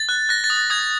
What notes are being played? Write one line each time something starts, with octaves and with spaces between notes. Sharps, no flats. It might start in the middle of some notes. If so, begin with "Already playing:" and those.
Already playing: A6
F#6
F#6 A#6
A6
D#6
A6
D#6 G#6